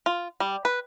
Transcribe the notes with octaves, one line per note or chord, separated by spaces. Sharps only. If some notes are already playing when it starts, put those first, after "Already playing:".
F4
G3
B4